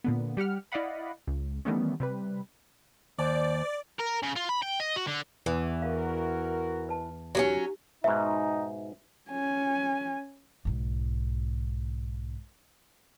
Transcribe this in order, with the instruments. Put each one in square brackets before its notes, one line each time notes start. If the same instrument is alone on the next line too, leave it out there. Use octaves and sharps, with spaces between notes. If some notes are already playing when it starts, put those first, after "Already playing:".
[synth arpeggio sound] A#2 D3 B3
G3 G4 F#5 F6
E4 D5 D#5 F5 F#5 B5
C#2
D#3 E3 G3 A3 B3 C#4
C3 G3 B4
[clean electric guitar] D#2 [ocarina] C5 [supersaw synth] D5
[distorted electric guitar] A#4
C#3
F4
B5
G5
D#5
F#4
D3
[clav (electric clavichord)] E2 [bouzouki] E3
[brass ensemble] F#4 A#4 [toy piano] F5
[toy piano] B4 A5
[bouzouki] F#3 A#3 C#4 [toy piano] D#4 G4
[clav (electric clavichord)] G#2 B2 [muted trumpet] D#4 [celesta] E5
[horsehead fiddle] C#4 G#5
[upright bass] B1 G#2